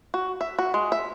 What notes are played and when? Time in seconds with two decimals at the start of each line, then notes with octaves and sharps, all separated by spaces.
0.14 F#4
0.41 E5
0.59 F#4
0.74 G#3
0.92 E5